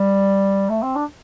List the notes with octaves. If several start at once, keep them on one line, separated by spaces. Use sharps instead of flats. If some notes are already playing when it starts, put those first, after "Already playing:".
Already playing: G3
A3
C4
D4